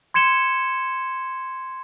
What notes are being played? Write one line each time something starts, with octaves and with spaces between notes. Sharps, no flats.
C6 G#6 C#7 E7 G7